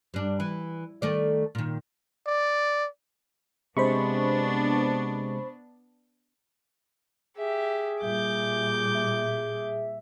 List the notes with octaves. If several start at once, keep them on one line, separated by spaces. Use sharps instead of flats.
G2 D4
E3
D#3 A3 D5
A#2 D#3
D5
C3 G#3 B3 D4 C5 B5 C#6
G4 G#4 E5
A#2 G3 E5 D6 G6
E5